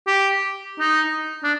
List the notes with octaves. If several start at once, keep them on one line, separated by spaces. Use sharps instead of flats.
G4
D#4
D4